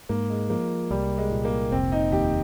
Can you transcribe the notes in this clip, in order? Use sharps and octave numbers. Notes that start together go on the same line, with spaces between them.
G#2 A#3
G#3
F3 A#3
C2 G3
G#3
A#2
A#3
F1 C4
D#4
D#2 G4